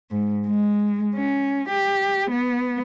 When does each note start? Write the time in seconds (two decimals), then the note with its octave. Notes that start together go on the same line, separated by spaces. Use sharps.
0.11 G#2
0.47 G#3
1.15 C#4
1.69 G4
2.30 B3